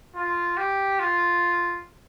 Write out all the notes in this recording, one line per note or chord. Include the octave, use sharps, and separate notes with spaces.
F4
G4
F4